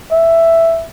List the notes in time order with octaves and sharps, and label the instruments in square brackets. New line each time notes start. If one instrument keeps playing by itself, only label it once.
[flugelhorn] E5